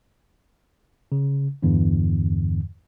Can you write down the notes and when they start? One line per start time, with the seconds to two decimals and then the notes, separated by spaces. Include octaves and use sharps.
1.12 C#3
1.63 E2 G2 D3 E3